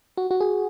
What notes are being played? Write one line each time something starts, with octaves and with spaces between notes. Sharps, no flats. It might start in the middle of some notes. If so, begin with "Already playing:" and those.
F#4
F#4
G#4